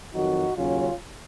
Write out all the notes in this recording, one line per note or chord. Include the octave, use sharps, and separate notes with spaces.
F2 D#3 F#3 D#4 F#4
D#2 C#3 F#3 C#4 F4